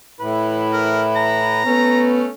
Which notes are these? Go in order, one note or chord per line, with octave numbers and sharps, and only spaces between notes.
A2 E4 B4
A#4
A#5
A3 B3 C#4